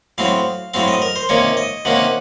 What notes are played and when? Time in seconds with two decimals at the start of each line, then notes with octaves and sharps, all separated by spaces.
0.18 A2 F#3 C4 F5
0.74 A2 F#3 C4 F5
0.88 D#5
1.02 A#4
1.16 C5
1.29 C3 D#3 A#3 C#4 C#5
1.57 D#5
1.85 C3 D#3 A#3 C#4 F#5